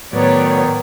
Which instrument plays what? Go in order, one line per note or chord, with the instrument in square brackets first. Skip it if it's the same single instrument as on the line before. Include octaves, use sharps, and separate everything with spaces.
[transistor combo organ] A2 F#3 [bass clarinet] D#3 [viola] B3 [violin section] C#5 D5